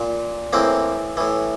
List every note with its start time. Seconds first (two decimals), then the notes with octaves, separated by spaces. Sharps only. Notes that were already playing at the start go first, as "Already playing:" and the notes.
Already playing: A#2
0.53 A2 E3 A#3 C4
1.17 A2 E3